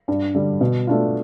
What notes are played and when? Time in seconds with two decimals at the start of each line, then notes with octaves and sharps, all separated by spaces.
0.08 G2
0.34 D3 G3
0.61 B2
0.87 A3 D4 F4